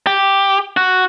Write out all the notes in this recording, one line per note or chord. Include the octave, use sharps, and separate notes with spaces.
G4
F#4